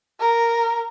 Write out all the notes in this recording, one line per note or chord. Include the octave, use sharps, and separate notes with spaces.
A#4